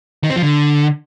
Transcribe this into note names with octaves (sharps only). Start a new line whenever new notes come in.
D#3
C4
F3
D3